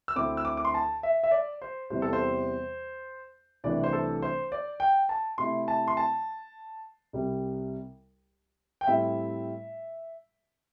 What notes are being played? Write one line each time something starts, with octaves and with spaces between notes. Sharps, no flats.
E6
D2 D3 C4 E4 D6
E6
D6
D6
C6
A5
E5
E5
D5
C5
E2 C3 E3 G3 C5
A4
C5
C2 C3 E3 A3 D4 D5
C5
A4
C5
D5
G5
A5
C3 A3 E4 C6
A5
C6
A5
C2 C3 G3
G5
A2 G3 C4 E4 E5